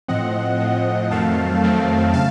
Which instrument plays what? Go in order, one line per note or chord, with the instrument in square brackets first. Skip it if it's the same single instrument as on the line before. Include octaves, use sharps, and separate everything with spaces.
[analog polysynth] A2 F3 C4 D#5 F#5
A2 F3 C4
F2 D#3 F#3 A3 C4 F5 A5
F2 D#3 F#3 A3 C4
C#3 F5 A5